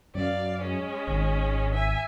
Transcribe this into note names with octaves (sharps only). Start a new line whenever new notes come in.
F#2 D5 F5
G#3 C#4
G#1
E5 G#5